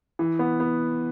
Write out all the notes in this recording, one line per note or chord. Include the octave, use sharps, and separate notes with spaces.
E3
B3
B3